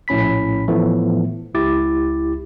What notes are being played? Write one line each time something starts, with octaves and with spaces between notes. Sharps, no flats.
A#1 A2 C#4 B5 B6
A2 E3 F3 A3 B3
C#2 E4 G4 D6 A6